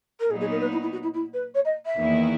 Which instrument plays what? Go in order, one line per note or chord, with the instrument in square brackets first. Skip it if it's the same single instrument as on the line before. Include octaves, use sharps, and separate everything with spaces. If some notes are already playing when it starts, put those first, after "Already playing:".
[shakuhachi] A#4
[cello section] A#2 F#3 B3 D#4 [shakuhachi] G#4
[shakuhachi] G#4
A#4
B4
E4
E4
F#4
E4
E4
B4
C#5
D#5
E5
[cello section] E2 D#3 A#3 E4